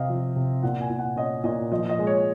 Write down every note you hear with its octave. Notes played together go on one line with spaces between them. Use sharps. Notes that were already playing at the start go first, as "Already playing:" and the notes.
Already playing: C3 C4 D#5 F5
F3
C3
A#2 F#5
G#5
A#2
F#5
C#4 D#5
A#2 D#5
F3 D#5
D#5
G#3
C#5